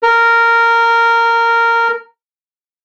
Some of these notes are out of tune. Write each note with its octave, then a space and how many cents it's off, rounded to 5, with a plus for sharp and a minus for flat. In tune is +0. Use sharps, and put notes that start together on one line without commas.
A#4 -10